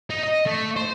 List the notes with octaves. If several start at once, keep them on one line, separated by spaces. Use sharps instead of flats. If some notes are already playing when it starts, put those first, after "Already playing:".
D#4
D#5
A3
C5